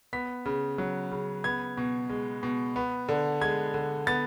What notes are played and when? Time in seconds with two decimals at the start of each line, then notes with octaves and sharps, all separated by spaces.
0.13 B3 B6
0.45 C#3
0.78 F#3
1.11 C#3
1.44 B3 G#6
1.77 B2
2.10 G#3
2.43 B2
2.76 B3
3.09 D3
3.41 G#3 G#6
3.74 D3
4.07 B3 A6